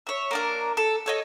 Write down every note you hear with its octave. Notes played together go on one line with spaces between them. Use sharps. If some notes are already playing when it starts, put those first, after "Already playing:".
C#5 E5
A#3 D4 A#4
A4
A4 C#5 D#5